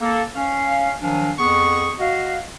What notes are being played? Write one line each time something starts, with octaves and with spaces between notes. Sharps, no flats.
A#3 A4
C#4 F5
D#3 F3 F#3 D4 F5 G#5
F2 B3 G#4 C#6
F#4 D#5 F5